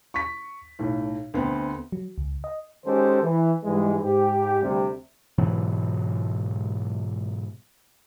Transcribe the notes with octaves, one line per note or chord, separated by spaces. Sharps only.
C#6 B6
B1 A2
D2 B3 C4
F#3
C#2
D#5
D#3 G#3 C#4 G4 A4 C5
E3
G#2 E3 G3 G#3
G#2 G4
D2 C3 G3
G#2 B2 E3 F#3